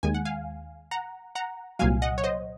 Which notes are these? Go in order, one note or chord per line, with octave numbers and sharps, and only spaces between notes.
D#2 D#3 G#3 G#5
F#5
F5 G#5
F#5 A#5
F#5 A#5
C2 A#2 F#3 F5 G#5
D#5 F#5
C#5
C5 D#5